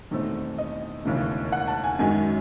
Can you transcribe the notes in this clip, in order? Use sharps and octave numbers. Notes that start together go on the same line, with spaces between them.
E1 E2 D#3 A3 C4
D#5
E1 D#2 C#3 E3 A3
F#5
A5
G#5
F#2 D#3 G#3 G#5